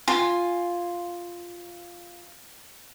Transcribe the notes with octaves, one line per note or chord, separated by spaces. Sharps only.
F4 G#5